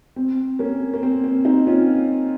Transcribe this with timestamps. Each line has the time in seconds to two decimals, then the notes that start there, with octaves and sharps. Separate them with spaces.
0.16 C4
0.59 A#3 C#4
0.94 A#3
1.03 C4
1.24 C4
1.45 C4 D#4
1.67 C#4 F4